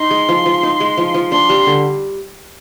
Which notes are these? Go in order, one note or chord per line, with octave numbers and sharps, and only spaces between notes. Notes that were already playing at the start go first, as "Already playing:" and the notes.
Already playing: D#4 C6
G#3
F3
F3
D#4
G#3
F3
F3
D4 C6
G3
D3